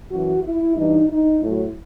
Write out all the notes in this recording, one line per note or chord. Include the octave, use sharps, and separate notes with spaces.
F#2 E3 F#4
E4
G2 E3 D#4
D#4
A2 F#3 E4